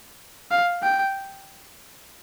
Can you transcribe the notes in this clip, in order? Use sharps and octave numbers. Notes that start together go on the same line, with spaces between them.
F5
G5